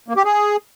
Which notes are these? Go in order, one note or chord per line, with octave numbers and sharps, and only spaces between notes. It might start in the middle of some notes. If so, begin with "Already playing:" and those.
A#3
G4
G#4